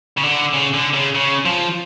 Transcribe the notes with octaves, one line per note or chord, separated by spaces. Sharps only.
C#3
D3
C#3
D3
C#3
C#3
F3